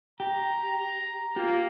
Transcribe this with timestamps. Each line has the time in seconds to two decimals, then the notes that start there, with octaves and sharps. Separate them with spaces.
0.20 G4 A#5
1.36 A#3 F4 G4